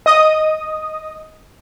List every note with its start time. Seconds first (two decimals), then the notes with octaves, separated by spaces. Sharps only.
0.06 D#5 D#6